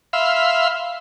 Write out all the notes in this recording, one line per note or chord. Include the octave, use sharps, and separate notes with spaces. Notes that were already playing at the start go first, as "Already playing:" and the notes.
E5 F5 B5 C6